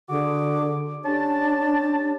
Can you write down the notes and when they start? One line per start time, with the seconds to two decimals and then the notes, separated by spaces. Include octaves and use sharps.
0.10 D3 F#4 G#4 D6
1.05 C#4 D4 G4 A5